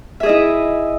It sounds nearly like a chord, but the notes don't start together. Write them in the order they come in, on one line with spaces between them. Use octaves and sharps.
E5 G#4 D#5 E4